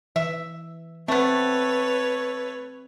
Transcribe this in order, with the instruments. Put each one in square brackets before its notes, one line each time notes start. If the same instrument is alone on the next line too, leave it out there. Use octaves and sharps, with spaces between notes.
[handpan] E3 [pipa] E5
[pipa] A3 B3 [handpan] C4 [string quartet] B4 C#5